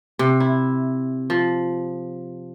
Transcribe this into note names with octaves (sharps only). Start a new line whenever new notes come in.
C3
E4
F3